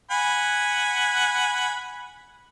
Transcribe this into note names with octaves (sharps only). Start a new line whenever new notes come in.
F#5 G#5 B5